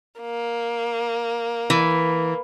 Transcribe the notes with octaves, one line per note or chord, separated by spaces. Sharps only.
A#3
E3